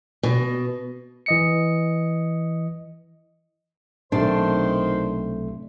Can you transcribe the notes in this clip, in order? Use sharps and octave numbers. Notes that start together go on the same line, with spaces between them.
B2
E3 D#5 C#7
B1 C3 D#3 A3 D4 C5 C6